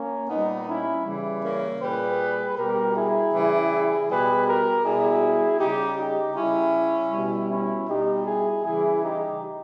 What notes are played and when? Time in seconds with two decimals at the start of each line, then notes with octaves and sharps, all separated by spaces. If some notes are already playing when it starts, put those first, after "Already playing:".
Already playing: A#3 C#4
0.29 A#2 G3 B3 D#4
0.67 C#4 E4
1.04 C#3 E3 G3
1.42 A#3 C#4
1.80 A#2 G3 G#4 B4
2.56 B2 G3 G4 A#4
2.94 E4 G#4
3.32 C#3 E3 G3
4.08 B2 G3 G#4 B4
4.46 G4 A#4
4.84 B2 G3 E4 G#4
5.59 C#3 G3 D#4 G4
5.97 D#4 G4
6.35 C#3 G3 C#4 E4
7.11 B2 G3
7.49 C#4 E4
7.87 B2 G3 D#4 G4
8.25 E4 G#4
8.63 C#3 E3 G3 E4 G#4
9.01 D#4 G4